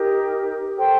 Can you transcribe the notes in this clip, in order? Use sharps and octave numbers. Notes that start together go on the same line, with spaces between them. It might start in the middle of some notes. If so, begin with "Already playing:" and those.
Already playing: D#4 G4 A#4
A4 C5 G5